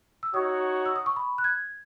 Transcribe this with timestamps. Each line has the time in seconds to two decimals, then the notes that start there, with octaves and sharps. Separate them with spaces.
0.23 E6
0.34 D#4 F#4 C#5 D#6
0.86 E6
0.96 D#6
1.06 C#6
1.16 B5
1.38 F#6
1.44 G#6